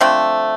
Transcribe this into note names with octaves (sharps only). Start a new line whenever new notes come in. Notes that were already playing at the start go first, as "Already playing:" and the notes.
D3 F3 A3 C4